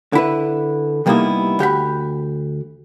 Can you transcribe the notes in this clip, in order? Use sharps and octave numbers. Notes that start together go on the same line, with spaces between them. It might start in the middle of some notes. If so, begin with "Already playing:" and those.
D3 E4 B4
C3 G3 A#3 B3 D#4 E4
D2 G4 F#5 B5